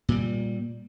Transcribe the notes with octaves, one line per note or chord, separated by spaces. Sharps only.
A#2 G3